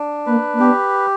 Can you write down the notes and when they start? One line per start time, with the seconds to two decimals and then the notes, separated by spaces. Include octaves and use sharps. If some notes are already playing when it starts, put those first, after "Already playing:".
Already playing: D4
0.26 A#3 B4
0.53 A#3
0.60 B3 G4